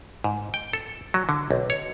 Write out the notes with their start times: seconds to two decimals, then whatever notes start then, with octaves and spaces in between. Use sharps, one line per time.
0.24 G#2
0.54 G5
0.73 A4
1.14 F#3
1.29 D3
1.51 B1
1.70 C#5